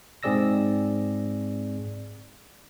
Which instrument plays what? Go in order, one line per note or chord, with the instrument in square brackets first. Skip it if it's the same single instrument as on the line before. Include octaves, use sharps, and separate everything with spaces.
[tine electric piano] G#2 C4 G#4 D5 E6 A#6